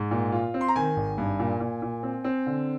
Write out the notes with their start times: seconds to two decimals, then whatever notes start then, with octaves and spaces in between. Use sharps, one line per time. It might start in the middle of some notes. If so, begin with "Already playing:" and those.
Already playing: G#2
0.11 A#2
0.32 F4
0.54 C4
0.61 C6
0.68 A#5
0.76 D#3 G#5
0.97 G#1
1.18 G2
1.39 A#2
1.60 A#2
1.82 A#2
2.03 C4
2.24 C4
2.46 D3